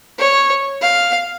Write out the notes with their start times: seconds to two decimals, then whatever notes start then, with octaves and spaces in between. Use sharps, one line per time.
0.19 C#5
0.82 F5